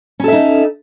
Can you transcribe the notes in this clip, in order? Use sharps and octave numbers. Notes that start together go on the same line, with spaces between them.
C#4 D#4 A4 E5